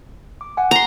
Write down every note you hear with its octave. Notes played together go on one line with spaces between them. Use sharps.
D6
F#5 G#5
A#5 C6